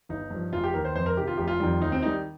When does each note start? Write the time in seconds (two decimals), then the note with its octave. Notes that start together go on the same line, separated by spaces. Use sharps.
0.09 G1 D#4
0.31 G2 F3
0.52 F1 F4
0.64 G4
0.74 D#2 D#3 A#4
0.85 C5
0.95 F2 C5
1.06 A#4
1.17 C3 D#3 G4
1.27 F4
1.37 F1 G4
1.48 F4
1.60 F2 D#3 G3
1.81 D#2 D#4
1.92 C4
2.02 D#3 G3 D#4